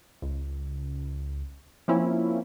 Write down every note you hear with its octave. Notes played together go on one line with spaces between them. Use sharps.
C#2
F3 A#3 C4 C#4 E4